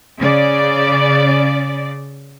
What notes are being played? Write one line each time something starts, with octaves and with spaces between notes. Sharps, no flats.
C#3 D5